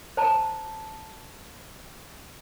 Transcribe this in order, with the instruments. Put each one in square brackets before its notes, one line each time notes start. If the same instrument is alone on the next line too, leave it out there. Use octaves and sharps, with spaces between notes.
[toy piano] C5 A5 A#5